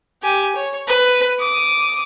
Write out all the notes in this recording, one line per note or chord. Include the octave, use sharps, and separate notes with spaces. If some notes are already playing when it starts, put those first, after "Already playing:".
G4 G#5
C#5
B4
D6 D#6